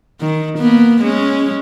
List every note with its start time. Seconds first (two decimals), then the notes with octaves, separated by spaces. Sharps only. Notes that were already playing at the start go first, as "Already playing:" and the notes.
0.21 D#3
0.58 A#3 B3
1.01 G#3 C#4